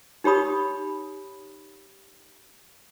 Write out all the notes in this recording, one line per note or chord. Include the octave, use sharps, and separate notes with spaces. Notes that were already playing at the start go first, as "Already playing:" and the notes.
D#4 G4 C#5 B5 D#6